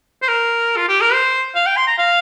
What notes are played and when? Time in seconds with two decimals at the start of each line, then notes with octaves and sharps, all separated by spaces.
0.22 C5
0.28 A#4
0.77 F4
0.88 G4
1.01 A#4
1.13 C5
1.56 F5
1.66 G5
1.77 C6
1.87 A#5
1.98 F5